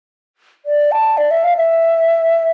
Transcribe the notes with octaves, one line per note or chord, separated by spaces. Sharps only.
D5
A5
D5
E5
F5
E5